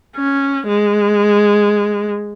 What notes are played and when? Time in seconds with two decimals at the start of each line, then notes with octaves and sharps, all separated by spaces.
0.16 C#4
0.68 G#3